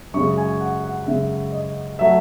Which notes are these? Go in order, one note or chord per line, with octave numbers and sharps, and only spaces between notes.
F#2 C#3 G#3 C#6
G#5
F#5
F#5
F#2 C#3 G#3 E5
D#5
F#3 A3 E5